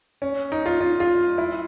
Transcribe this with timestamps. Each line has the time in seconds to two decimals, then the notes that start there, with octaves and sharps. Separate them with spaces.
0.22 C#4
0.52 D#4
0.66 F4
0.81 F4
1.00 F4
1.38 E4